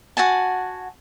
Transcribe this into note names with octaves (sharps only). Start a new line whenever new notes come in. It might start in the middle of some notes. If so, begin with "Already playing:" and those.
F#4 F#5 G#5 A5